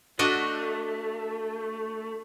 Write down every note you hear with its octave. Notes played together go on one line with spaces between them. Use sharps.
A3 D4 F#4 D#5